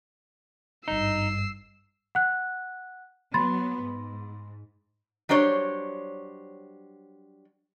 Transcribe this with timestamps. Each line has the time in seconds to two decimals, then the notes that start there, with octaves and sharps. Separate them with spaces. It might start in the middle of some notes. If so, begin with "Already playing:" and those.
0.88 G#1 G2 D#4 E6 C7
2.15 F#5 F#6
3.34 F#3 B3 B5 C6 A6
3.85 G#2
5.29 F#3 G3 D4 C5 C#5